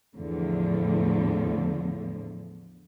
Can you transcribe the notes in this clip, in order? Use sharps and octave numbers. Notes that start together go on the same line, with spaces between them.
E2 A2 D3 F3